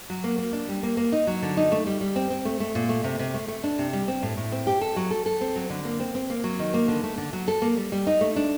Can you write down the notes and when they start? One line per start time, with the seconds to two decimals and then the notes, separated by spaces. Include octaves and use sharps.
0.10 F#3
0.24 A#3
0.38 A#3
0.53 D4
0.69 G3
0.83 A#3
0.97 A#3
1.12 D#4
1.27 F#3
1.43 D3
1.57 D#4
1.72 A3
1.86 G3
2.01 G3
2.16 C4
2.30 C4
2.45 A3
2.60 A3
2.75 A#2
2.89 A3
3.04 C3
3.19 C3
3.34 A3
3.48 A3
3.64 D4
3.78 C3
3.93 G3
4.08 C4
4.23 A2
4.37 A2
4.52 C4
4.67 G4
4.81 A4
4.96 F#3
5.11 A4
5.26 A4
5.41 C4
5.56 F#3
5.70 D3
5.85 A#3
6.00 C4
6.15 C4
6.30 A#3
6.44 F#3
6.59 D#3
6.74 A#3
6.88 D3
7.03 A3
7.18 D3
7.33 F#3
7.48 A4
7.62 A#3
7.77 G3
7.92 G3
8.07 D#4
8.21 A3
8.36 D4